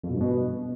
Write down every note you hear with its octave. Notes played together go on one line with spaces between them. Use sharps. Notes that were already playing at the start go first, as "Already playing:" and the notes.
F2
B2
G2
B2